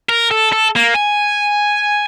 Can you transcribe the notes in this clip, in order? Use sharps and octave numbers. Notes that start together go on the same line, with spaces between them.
A#4
A4
A4
A#3
G#5